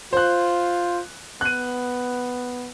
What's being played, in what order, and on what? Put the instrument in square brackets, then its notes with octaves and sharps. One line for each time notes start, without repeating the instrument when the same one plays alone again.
[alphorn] F4 [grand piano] C5 F#6
[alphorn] B3 [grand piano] F#6 D#7